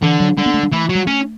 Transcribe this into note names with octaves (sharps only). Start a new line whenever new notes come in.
D3 E3
F#3
D3 G3
B3
A3
G3
E3 A3
F#3
G3
A3 C#4